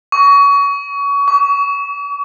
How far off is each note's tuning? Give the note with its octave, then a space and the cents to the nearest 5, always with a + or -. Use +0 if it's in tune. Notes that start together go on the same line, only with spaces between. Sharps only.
C#6 +30
C#6 +45